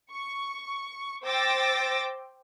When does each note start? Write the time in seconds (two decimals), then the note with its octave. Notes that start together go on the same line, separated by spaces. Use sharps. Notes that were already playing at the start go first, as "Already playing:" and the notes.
0.11 C#6
1.24 C5 G5 D6 E6 A6 A#6